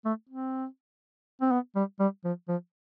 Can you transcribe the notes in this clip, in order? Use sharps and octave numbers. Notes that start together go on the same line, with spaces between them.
A3
C4
C4
B3
G3
G3
F3
F3